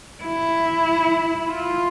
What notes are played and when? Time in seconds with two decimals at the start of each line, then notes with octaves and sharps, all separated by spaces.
0.24 E4
1.49 F4